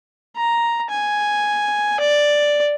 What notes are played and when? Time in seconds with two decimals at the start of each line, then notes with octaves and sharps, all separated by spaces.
0.37 A#5
0.90 G#5
2.00 D5